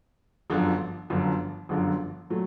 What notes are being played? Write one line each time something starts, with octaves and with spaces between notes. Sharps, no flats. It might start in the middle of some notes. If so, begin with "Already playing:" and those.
G1 F#2 D3 F3
G1 F#2 D3 F3
G1 F#2 D3 F3
A#2 F#3 A3